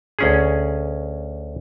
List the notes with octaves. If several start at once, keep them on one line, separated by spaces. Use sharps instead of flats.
D2 C#4 G#4